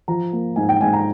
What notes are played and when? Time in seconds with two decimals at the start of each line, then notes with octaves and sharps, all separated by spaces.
0.08 F3 A#5
0.33 A#3
0.56 G#2 G#5
0.69 G5
0.81 G#2 G#5
0.93 A#5